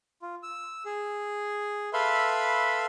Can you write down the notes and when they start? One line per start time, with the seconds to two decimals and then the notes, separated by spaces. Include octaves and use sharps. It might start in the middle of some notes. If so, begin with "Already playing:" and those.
0.22 F4
0.43 E6
0.85 G#4
1.93 A4 B4 E5 F5 B5 C6